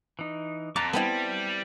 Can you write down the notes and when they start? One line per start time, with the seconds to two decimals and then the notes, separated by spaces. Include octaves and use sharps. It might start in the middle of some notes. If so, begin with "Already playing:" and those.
0.19 E3 D#4
0.76 F2 A5 A#5 D6
0.93 G3 B3 C4 E4 A5